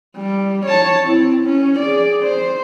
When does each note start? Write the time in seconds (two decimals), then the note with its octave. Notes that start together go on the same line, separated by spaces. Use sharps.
0.17 G3
0.66 C#5 A5
1.03 C4 E4
1.44 C#4
1.79 G#4 D5
2.23 C5